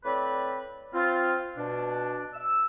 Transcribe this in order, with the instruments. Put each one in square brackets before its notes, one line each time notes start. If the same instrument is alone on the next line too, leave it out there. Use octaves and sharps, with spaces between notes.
[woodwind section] A2 C4 B4 D5 B5
C4 F4
B2 D4
E6